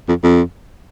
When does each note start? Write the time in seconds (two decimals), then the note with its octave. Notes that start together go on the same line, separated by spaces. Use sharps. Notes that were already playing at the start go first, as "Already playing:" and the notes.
0.09 F2
0.23 F2